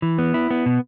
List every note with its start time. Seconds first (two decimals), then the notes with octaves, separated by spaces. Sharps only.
0.02 E3
0.19 B3
0.34 E4
0.50 B3
0.66 B2